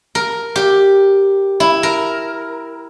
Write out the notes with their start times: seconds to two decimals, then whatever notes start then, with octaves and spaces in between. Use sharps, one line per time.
0.15 A#4
0.56 G4
1.60 E4
1.83 A#4